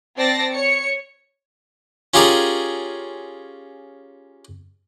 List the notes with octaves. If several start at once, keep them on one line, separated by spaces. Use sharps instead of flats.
C4 D5 A5 A#6 C7
C#5 C#7
C#4 F4 G4 G#4 A#4 D5